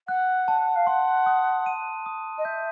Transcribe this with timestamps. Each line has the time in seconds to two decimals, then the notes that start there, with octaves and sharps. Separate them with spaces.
0.08 F#5 F#6
0.48 A5
0.76 F5
0.87 F#5 C6
1.26 D#6
1.66 D#7
2.06 D#6
2.38 D#5
2.45 E5 G6